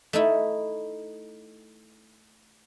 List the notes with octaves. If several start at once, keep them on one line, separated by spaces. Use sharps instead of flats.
A3 D#4 E4